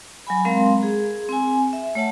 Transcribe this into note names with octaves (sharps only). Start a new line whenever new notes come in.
F#3 G#5 B5
G#3 C4 A#4 F5 A#5 C6
G#4
C4 G#5
E5
A3 C#5 F#5 A5